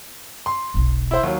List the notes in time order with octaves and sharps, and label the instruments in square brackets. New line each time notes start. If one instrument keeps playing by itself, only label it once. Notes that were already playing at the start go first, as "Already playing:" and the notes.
[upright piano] C6
[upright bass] E1 B1
[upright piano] E4 C5
D#2 F#3